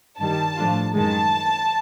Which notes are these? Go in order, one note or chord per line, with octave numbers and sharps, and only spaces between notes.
G2 D#3 G3 A5
A2 F3 A3 D4 F4
F#2 D#3 G#3 A5